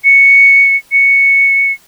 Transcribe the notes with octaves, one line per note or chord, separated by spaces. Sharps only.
C#7
C#7